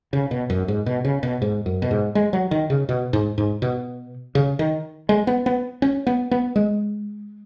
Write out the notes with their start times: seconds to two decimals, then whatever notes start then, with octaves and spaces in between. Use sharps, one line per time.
0.13 C#3
0.31 B2
0.50 F#2
0.68 G#2
0.86 B2
1.05 C#3
1.23 B2
1.42 G#2
1.66 F#2
1.82 B2
1.91 G#2
2.15 G#3
2.33 F#3
2.51 D#3
2.70 C#3
2.89 B2
3.13 G#2
3.38 G#2
3.62 B2
4.35 C#3
4.59 D#3
5.09 G#3
5.27 B3
5.46 B3
5.82 C#4
6.07 B3
6.31 B3
6.56 G#3